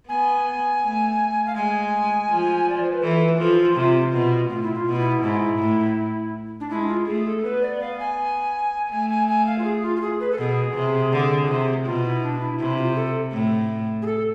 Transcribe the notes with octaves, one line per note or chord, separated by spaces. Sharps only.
B3 G#5
A3
F5
G#3 G#5
F3
D5
C5
B4
E3 A4
B4
F3 A4
E4
F4
C3
B2
A2 F4
E4
F4
B2
F4
E4
G#2 E4
A2
D4
G#3 E4
F4
A3 G#4
A4
B3 B4
D5
F5
G#5
A3 G#5
G#5
G#5
F5
F4
G#4
F4
F4
G#4
B4
A4
B2 G#4
C3
D3
C3
B2 F4
E4
D4
E4
C3 E4
F4
G#4
A4
A2
G#4
A4